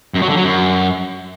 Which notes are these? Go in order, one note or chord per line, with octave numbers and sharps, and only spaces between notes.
F#2
F#3
D3
F#3
F#2